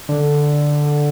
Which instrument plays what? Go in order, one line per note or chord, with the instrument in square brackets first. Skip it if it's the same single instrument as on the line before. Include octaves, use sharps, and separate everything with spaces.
[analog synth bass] D3